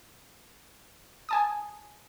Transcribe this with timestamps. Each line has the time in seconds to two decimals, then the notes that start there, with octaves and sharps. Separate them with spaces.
1.29 G#5 A5 D#6